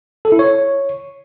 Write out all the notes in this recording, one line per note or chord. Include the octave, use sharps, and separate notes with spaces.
A4
E4
C#5